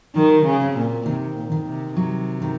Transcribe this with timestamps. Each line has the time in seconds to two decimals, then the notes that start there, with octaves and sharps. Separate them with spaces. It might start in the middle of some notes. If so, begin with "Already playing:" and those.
0.15 D#3 F#3
0.45 C#3
0.61 C4
0.76 A#2
1.06 C3 D#3
1.36 A#2
1.52 D#3
1.67 C3
1.96 C3 F#3
2.42 D#3